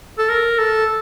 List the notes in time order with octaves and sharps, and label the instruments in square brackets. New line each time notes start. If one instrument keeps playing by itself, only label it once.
[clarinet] A4
A#4
A4